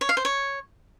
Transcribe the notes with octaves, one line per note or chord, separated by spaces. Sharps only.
C#5
F5
C5
C#5